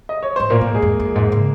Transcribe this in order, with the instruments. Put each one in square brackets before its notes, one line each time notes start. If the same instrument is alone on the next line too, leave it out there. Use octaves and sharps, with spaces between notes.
[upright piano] D#5
C#5
[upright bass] G#2 [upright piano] C5
[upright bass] A#2 [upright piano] A#3 A#4
[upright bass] A#2
G#2
[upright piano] G#3 G#4
[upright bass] F2
F2
G#2
C#3